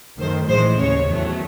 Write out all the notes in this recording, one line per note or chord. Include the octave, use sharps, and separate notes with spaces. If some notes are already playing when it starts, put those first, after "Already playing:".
F#2 D#3 F#3 A3 C5
A1 A2 E3 G#3 C5
D#2 C#3 G#3 C#5
E2 D#3 F#3 A3